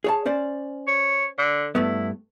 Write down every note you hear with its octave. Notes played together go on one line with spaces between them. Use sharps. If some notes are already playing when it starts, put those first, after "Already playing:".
G#4 C#5 A5
C#4 C5 D5
C#5
D3
G2 A3 B3 E4